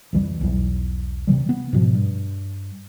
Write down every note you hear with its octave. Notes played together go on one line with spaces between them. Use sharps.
C2 F2 E3 G3
B1 E2
C3 D#3 E3 G3
B3
G#2 B2 F3
G2